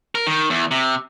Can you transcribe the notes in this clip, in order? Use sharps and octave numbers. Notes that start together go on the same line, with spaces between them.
A#4
D#3
E2
C3